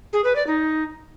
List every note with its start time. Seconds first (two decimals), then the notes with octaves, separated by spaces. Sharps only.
0.13 G#4
0.24 B4
0.36 D5
0.47 D#4